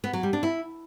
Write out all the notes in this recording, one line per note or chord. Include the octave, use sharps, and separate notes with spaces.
B3
F#3
G3
D4
E4